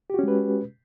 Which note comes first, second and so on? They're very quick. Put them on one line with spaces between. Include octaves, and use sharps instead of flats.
G4 F#4 C#4 G#3 B4